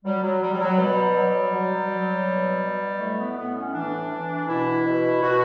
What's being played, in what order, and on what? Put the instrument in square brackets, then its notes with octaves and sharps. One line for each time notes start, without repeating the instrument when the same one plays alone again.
[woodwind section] F#3 G3
F#3
F#3 G3
G3
F#3
B2 G3
F#3
F#3
F#3
B2
B2
A2 A3
B3
A2 B3
C#4
E3 D4
E3
B2 E4
B2
B2 F#4